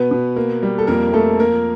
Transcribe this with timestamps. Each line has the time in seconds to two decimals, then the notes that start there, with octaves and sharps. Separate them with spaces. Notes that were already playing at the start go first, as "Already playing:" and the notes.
Already playing: B2 B3 B4
0.11 B2
0.36 A#3
0.63 G3
0.78 A4
0.87 F2 A#3 A#4
1.13 F3 A3 A4
1.39 A#3 A#4